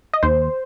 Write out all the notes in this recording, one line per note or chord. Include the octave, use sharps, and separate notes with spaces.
D#5
D#2 C5